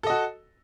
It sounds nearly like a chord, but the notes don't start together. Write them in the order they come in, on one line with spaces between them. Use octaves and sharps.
A4 D#5 F#4